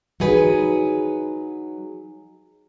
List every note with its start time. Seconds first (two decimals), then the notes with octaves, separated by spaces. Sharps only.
0.20 F#3 D#4 G#4 B4